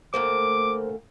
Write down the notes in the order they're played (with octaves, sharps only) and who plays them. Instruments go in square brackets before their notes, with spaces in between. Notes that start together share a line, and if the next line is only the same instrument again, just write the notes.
[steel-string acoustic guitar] D2 A3 A#3 [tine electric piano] A#4 C5 [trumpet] D6